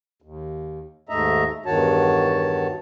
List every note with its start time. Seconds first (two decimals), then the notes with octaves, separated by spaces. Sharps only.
0.22 D#2
1.09 D#2 G#2 A3 D#5 E5 A#5
1.66 E2 G2 D#3 F#4 C#5 A5